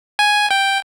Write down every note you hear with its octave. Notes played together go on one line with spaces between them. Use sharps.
G#5
G5